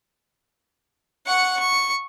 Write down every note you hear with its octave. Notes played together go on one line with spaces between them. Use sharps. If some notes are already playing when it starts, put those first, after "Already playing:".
F#5 C#6
C#6